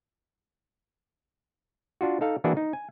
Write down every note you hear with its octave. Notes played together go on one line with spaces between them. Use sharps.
D4 F4 F#4
D#4 A4 F5
E3 A#3 D4 E4 F#4 G#4
D#4
G#5